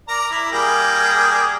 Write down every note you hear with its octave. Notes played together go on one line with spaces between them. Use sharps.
A#4 D5 A#5
E4
G3 A#3 G#4